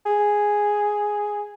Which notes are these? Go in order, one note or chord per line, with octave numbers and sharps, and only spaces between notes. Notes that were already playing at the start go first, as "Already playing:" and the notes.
G#4